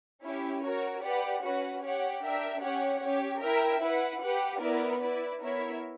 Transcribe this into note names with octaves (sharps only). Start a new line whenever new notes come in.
C#4 E4 G4 C#5
F#4 A#4 C#5
G4 B4 D5 F#5
C#4 F#4 B4 F#5
G4 C#5 F#5
D4 A#4 E5 G5
C#4 G4 C#5 F#5
C#4 G4 C#5
E4 A#4 E5 G5
E4 B4 F#5
G4 B4 F#5
B3 E4 A#4 D5
E4 B4 D5
B3 E4 A#4 C#5 E5